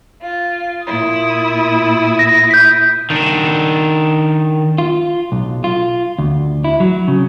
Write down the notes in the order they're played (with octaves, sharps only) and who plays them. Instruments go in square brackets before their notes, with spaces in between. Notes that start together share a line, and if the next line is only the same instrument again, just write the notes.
[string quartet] F4
A#2 E4 D#6
[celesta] A#6
G6 B6
[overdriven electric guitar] D#3 D4
[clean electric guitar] F4
B1
F4
D2
E4
F#3
C#3